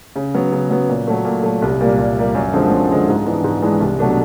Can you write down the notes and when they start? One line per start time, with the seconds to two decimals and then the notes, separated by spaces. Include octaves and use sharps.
0.16 C#3
0.34 F#3 B3
0.52 C#3
0.70 F#3 B3
0.89 A#2
1.08 F#3 A3
1.25 A#2
1.43 F#3 A3
1.62 C2
1.80 A#2 G3 A#3
1.98 C2
2.17 A#2 G3 A#3
2.35 F#2
2.53 D3 F3 G#3 C4
2.71 F#2
2.90 D3 F3 G#3 C4
3.08 G#2
3.26 E3 G#3 B3 D4
3.44 G#2
3.62 E3 G#3 B3 D4
3.80 C2
3.99 B2 F#3 A3 D4